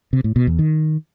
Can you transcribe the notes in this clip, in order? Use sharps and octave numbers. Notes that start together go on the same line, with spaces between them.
C3
A2
B2
E2
D#3